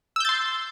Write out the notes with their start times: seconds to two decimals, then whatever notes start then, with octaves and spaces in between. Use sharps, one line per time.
0.16 E6
0.20 G6
0.25 A6
0.29 C6